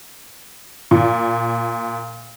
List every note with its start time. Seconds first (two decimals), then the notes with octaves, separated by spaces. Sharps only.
0.91 A#2